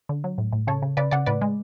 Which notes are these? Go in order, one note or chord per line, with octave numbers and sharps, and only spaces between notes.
D3
F#3
A2
A2
C#3 A4 C#5
C#3
C#3 B4 D5
C#3 D5 F#5
A2 B4 D5
G#3